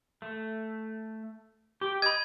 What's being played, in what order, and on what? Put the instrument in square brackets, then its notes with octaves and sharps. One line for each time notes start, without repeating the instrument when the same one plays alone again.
[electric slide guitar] A3
G4
[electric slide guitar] D#5 [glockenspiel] B5 G#6